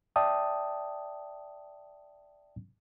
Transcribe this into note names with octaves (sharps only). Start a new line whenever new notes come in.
D5 E5 G5 A5 D#6